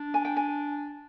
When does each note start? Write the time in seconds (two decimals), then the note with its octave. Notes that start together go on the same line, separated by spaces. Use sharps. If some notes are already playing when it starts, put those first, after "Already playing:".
Already playing: D4
0.14 G#5
0.25 G5
0.36 G#5